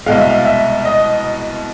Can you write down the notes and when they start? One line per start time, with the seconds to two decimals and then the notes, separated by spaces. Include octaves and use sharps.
0.06 C2 B2 G#3 F5
0.18 E5
0.29 F5
0.45 E5
0.85 D#5